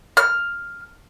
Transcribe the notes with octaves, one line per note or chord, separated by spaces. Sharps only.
F6